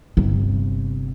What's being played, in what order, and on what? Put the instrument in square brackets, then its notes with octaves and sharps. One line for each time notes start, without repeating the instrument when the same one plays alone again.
[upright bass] G1 C3